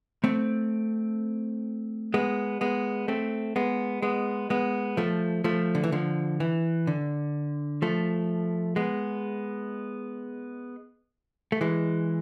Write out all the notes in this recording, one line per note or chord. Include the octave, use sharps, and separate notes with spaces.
A3 C4
G#3 B3
G#3 B3
A3 C4
G#3 B3
G#3 B3
G#3 B3
F3 A3
F3 A3
D3
E3
D3 F3
E3
D3
F3 A3
G#3 B3
A3
E3 G#3